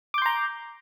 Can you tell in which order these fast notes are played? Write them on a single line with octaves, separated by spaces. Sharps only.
D6 G6 C6 A#5